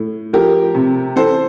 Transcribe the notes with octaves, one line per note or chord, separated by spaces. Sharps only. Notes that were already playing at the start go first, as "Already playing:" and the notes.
Already playing: A2
F3 G4 A#4
C3
E3 A4 C5